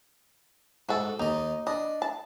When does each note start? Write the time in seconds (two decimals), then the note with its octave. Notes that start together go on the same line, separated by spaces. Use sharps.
0.89 G#2 F#4 A4
1.19 D#2 D#4 D#5
1.67 D4 D#5
2.02 A5